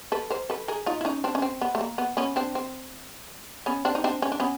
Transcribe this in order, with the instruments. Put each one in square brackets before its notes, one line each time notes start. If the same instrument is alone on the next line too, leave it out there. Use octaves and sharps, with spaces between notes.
[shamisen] A4 B4
A#4 C5
A4 B4
G#4 A#4
D#4 F4
E4
C#4 D#4
C4 D4
C#4
C4
B3
A3
A#3
B3
B3 C#4
C4 D4
C4
B3 C#4
C4 D4
D#4
C4 D4
C#4
D4
B3 C#4